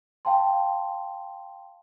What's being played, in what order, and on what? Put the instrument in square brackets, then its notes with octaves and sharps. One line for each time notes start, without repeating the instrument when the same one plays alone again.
[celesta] F5 G5 A5 C6